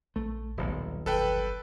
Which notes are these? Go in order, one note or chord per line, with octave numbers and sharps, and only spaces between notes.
A#1 A3
D#1 B1 A#2
G1 A4 B4 G5